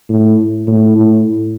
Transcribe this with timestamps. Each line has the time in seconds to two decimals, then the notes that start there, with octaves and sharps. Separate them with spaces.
0.09 A2
0.67 A2
0.96 A2